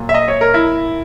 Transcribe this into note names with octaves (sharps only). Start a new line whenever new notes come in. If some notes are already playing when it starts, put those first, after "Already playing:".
Already playing: A#2 F#3
E5
D#5
C#5
A#4
E4